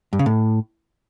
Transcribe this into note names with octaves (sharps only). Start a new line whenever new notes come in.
G2
C#3
A2